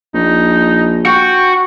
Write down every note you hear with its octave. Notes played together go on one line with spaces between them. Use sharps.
A#1 D#4
F#4 G5